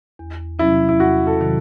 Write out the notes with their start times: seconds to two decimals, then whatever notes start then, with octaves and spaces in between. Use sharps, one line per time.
0.19 E2
0.59 C3 F#3 C#4 E4
0.89 E4
0.99 E2 F#4
1.27 A4
1.41 C3 D#3 F#3